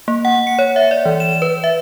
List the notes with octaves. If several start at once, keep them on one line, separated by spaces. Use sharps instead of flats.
A#3
F#5
C#7
C#5
E5
D5
E3
E7
B4
E5